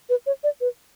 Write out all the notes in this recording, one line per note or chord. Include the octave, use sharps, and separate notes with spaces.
B4
C#5
D5
B4